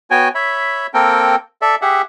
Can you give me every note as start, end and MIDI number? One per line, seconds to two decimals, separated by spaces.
0.11 0.29 59
0.11 0.29 66
0.11 0.29 73
0.11 0.29 79
0.11 0.29 80
0.35 0.87 73
0.35 0.87 76
0.35 0.87 83
0.94 1.36 58
0.94 1.36 60
0.94 1.36 69
0.94 1.36 70
0.94 1.36 79
1.62 1.75 69
1.62 1.75 74
1.62 1.75 76
1.82 2.02 67
1.82 2.02 68
1.82 2.02 76
1.82 2.02 78